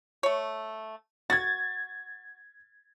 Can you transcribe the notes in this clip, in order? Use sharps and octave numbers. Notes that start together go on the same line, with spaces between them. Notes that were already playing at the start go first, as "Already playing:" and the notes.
A3 C#5
F#4 G#6 A6